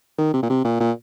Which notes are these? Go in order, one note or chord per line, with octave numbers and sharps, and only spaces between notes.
D#3
C3
A#2
C3
A#2
A#2